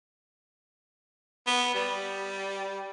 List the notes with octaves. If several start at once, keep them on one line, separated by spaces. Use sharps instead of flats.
B3
G3